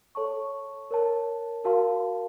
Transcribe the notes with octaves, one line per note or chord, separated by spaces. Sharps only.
A4 C#5 A5 C#6
A#4 C#5 A5
F#4 A#4 F5 A5 C6